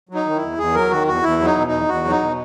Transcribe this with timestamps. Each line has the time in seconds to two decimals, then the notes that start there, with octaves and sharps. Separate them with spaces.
0.09 F#3
0.15 D#4
0.26 D#3
0.36 E4
0.42 E2
0.58 E2 G#4
0.75 F#3 A#4
0.91 D#3 F#4
1.07 E2 F#4
1.23 E2 E4
1.40 F#3
1.45 D#4
1.56 B2
1.67 D#4
1.72 E2
1.89 E2 F#4
2.05 F#3
2.10 D#4
2.21 B2